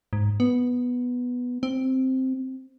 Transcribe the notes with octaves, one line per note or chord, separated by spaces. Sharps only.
G#2
B3
C4